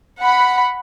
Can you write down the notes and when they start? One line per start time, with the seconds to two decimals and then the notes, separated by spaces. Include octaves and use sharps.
0.21 F#5 B5